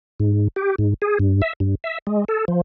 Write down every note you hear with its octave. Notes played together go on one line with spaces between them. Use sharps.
G#2
G4
G#2
G#4
G2
E5
G2
E5
G#3
A4
F3